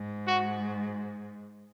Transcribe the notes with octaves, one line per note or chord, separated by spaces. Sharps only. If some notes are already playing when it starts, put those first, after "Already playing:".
Already playing: G#2
F#4